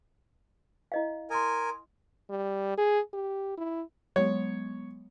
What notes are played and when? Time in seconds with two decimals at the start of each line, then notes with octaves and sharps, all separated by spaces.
0.92 E4 D#5 F5
1.30 A#4 G#5 C6 D#6
2.30 G3
2.78 G#4
3.13 G4
3.58 E4
4.16 F#3 G#3 B3 C#5